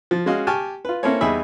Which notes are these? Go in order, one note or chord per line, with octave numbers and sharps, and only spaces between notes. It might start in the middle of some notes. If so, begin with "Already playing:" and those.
F3
G#3 C#4 F#4 D#5 F5
G4 G#5 A5 C#6 F6
F4 B4
A#3 C4 C#4 E4 A4 C#5
E2 G3 D#4 G#4 E5 B5